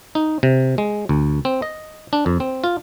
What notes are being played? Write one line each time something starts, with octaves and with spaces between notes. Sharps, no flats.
D#4
C3
G#3
D2
C4
D#5
D4
F2
C4
F4